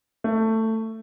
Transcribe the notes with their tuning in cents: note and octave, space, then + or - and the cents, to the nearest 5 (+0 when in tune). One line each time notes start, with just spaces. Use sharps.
A3 +15